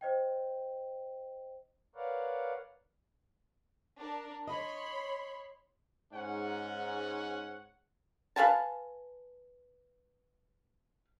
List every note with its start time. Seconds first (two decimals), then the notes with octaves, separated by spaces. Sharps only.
0.01 C5 D#5 G5
1.95 A#4 B4 C#5 D5 F5 F#5
3.98 D4 A#4
4.48 C#5 D#5 B5 C6
6.12 G#2 C#4 F#5
8.36 B4 F5 G#5 A5